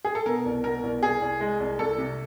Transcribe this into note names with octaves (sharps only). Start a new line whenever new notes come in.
G#4
A4
B2 A#4
C2
B2 A#4
C2
C2 G#4
C2
G#3
C2
C2 A4
C3